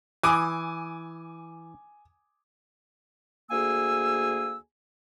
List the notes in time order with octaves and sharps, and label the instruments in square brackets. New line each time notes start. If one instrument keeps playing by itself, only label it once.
[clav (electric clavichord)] E3 [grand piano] G#5 D6 D#6
[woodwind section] D2 A#3 G#4 G#5 E6